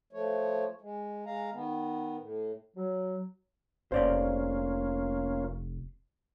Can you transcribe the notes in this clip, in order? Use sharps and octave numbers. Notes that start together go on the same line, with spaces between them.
F3 A3 C#5
G#3
G#3 F5 A#5
D#3 B3
A2
F#3
F1 A#3 C#4 F4 C5 D5 F5